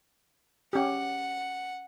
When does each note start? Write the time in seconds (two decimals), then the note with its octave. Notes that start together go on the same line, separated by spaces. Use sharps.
0.73 C#4 G4 F#5